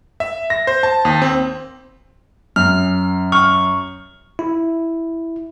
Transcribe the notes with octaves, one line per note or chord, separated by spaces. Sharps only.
E5
A#6
C5
A5
D#2
C4
F#2 F6
C#6 F6
E4